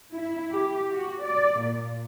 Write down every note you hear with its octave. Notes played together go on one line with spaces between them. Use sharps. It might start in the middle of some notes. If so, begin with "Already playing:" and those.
E4
G4
F#4
D5
A#2